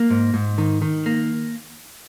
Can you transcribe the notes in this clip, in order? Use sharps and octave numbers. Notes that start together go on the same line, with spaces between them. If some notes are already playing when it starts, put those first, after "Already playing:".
Already playing: A#3
G#2
G#2
D#3
D#3
A#3